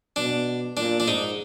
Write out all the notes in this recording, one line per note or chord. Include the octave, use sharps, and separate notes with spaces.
B2 D4
A#2 D4
D4
G#2 D#4